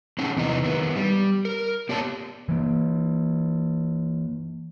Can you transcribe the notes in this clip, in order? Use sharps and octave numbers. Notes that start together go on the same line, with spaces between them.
C4 C#4 D#4 G#4 F#5 A5
E2 C3 E3 D#4
D#3 B3
G3
A#4
B3 G4 C#5 D5 A5
E3 A#3